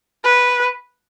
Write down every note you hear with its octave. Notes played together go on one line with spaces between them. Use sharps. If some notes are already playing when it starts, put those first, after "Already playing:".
B4